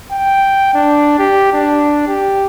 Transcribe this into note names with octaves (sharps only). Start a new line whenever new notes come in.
G5
D4
G4
D4
G4